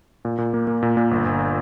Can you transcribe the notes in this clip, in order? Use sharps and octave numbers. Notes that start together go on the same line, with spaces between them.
A#2
A#2
A#3
A#3
A#2
A#2
G1
G1